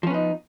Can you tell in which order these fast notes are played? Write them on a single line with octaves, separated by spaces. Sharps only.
F3 C#4 B3 D#4